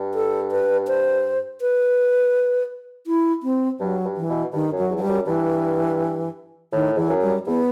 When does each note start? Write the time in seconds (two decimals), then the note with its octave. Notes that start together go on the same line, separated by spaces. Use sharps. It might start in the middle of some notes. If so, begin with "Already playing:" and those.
Already playing: G2
0.14 A4
0.52 B4
0.87 C5
1.61 B4
3.07 E4
3.43 C4
3.80 G2 F#3
4.05 G2
4.17 E3
4.29 B2
4.53 G2 D#3
4.72 F#2
4.78 F#3
4.90 E2
4.98 F#3
5.01 G2 G3
5.09 F#2
5.27 G2 E3
6.72 A2 D#3
6.97 E2 E3
7.09 F#2
7.22 G3
7.46 E2 B3